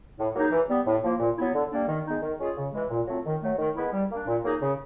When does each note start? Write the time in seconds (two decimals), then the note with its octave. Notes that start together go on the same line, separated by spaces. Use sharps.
0.17 A2
0.34 F#3 A#3 D#4 G#4
0.50 E3
0.69 G3 B3
0.85 A2
1.03 F3 A#3
1.19 A#2
1.36 F#3 B3 E4
1.53 D3
1.70 G3 A#3 D4
1.87 D#3
2.05 G#3 B3 D#4
2.22 D#3
2.39 G#3 C#4 F4 G#4
2.56 C#3
2.72 E3 G#3
2.90 A#2
3.07 F#3 A3 C4 F4
3.24 D#3
3.41 F#3 A3
3.58 D#3
3.75 G#3 B3 E4
3.92 G3
4.10 A#3 D4
4.26 A#2
4.44 F#3 A#3 D#4 G#4
4.61 C#3